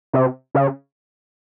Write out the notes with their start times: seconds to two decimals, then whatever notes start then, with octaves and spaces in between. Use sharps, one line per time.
0.13 C3
0.55 C#3